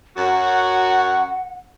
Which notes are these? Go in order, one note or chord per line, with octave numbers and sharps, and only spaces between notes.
F#2 F#4 F#5